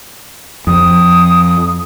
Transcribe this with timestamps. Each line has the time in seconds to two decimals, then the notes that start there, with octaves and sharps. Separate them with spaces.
0.67 F2 F3 D#6